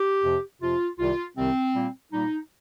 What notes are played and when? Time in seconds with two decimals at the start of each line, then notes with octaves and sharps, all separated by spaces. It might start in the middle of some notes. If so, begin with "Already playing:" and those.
Already playing: G4
0.23 F2 C3 F3
0.61 F2 C3 F3 F4
0.99 C2 C3 D#3 G3 F4
1.36 C2 C3 D#3 G3 C4
1.74 A#2 G3 A#3
2.11 A#2 G3 A#3 D#4